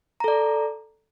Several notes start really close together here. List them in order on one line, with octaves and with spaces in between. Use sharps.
A#5 A4 D5